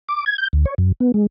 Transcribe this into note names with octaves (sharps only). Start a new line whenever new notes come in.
D6
G#6
G6
D2
C#5
F#2
B3
G#3